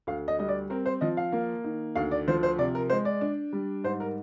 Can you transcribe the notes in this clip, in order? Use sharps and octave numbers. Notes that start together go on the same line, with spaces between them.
D2 F5
D#5
G3 D#5
D5
C4 A#4
C5
F3 D#5
F5
A#3
D#3
D2 F5
D5
F3 C5
C5
C3 D5
A#4
G#3 C5
D5
D4
G3
G#2 C5
A#4